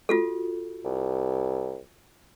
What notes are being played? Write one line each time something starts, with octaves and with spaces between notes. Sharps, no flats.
F4 F#4 A4
C2